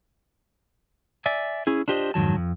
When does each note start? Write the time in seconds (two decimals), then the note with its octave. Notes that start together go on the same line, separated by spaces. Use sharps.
1.26 D5 E5 G#5
1.67 C#4 E4 G#4
1.88 D4 F4 G4 C5 D#5
2.14 F2 G#2 D#3 F#3 A5
2.36 F2